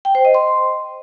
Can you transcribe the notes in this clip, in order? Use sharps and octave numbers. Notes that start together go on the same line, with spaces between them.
G5
C5
D#5
C6